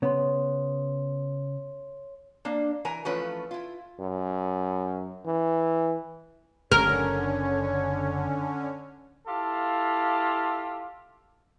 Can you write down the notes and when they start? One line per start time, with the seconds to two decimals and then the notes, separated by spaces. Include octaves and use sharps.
0.02 C#3 B3 C#5 C6
2.45 A#3 D4
2.85 E3 A#4 G#5 A#5
3.05 E3 F3 A3 C#4 F4 B4
3.51 E4 F4
4.00 F#2
5.26 E3
6.72 F#1 D3 C#4 A#4 C#5
9.27 E4 F4 G4 A4 F5